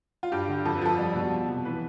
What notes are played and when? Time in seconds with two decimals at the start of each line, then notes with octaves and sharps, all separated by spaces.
0.23 F4
0.32 G2 G4
0.48 D3
0.65 F2 A4
0.76 B4
0.82 F3 A4
0.98 G3
1.15 B2
1.32 F3
1.49 C3
1.65 E3 B4